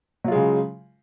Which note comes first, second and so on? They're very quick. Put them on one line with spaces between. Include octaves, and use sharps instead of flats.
F#3 F4 G#3 C#3